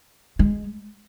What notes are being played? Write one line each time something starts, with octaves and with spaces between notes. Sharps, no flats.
G#3